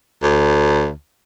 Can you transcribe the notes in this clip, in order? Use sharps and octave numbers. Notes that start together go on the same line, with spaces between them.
D2